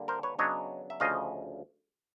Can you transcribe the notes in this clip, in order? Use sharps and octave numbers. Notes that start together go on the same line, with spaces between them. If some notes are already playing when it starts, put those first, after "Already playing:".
Already playing: D3 G3 A#3
A#4 C5
B4 C#5
C#3 F#3 B3 D4 C#5 D#5
E5
D2 C#3 F3 D#5 F5